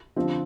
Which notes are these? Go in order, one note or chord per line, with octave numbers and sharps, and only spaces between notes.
D3 F3 C4